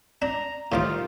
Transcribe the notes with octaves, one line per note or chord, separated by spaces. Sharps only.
D4 A#5
A2 D#3 F3 G3 F4 D6